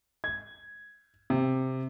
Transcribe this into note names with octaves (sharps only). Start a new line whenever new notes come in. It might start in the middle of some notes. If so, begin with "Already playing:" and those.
G#6
C3